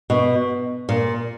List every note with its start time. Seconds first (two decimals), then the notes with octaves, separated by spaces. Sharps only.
0.10 B2
0.89 A#2